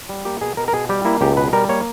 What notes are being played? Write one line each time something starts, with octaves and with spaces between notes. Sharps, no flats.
G3
A#3 G4
B2 G#4
B2 A#4
A#4
B2 G#4
G3 G4
A#3 E4
C#2 G4
B2 B4
G3 A#4
A#3 C#5